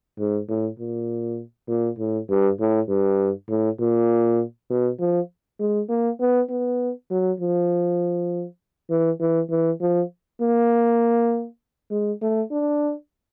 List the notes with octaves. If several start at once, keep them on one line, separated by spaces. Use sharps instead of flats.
G#2
A2
A#2
A#2
A2
G2
A2
G2
A2
A#2
B2
F3
G#3
A#3
B3
B3
F#3
F3
E3
E3
E3
F3
A#3
G#3
A3
D4